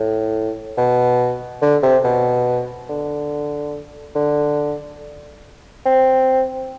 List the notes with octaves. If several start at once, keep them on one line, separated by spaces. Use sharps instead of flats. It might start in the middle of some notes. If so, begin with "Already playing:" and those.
Already playing: A2
B2
D3
C3
B2
D3
D3
C4